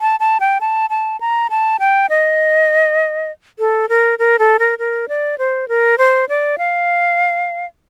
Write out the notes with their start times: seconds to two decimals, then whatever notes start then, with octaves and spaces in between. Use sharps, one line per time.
0.01 A5
0.20 A5
0.40 G5
0.61 A5
0.90 A5
1.21 A#5
1.50 A5
1.80 G5
2.10 D#5
3.59 A4
3.89 A#4
4.19 A#4
4.39 A4
4.59 A#4
4.79 A#4
5.09 D5
5.38 C5
5.68 A#4
5.98 C5
6.29 D5
6.58 F5